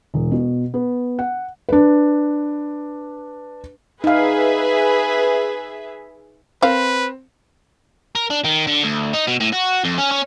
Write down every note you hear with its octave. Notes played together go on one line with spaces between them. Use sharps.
E1
B2
B3
F#5
D4 B4
D#4 G#4 B4 E5 F5
C4 A#4 B4 F5
A#4
D4
D#3
D3
D2
D#4
B2
A2
F#4
F2
C#4
C#4